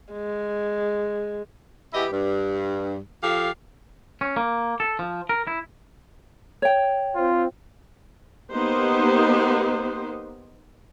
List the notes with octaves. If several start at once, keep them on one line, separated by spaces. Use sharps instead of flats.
G#3
E2 B3 E4 G4 D#5
G2
F3 G4 A4 F5
C#4
A#3
A4
F3
A#4
E4
C#5 G5
C4 F4
A#3 B3 D#4 G4 C5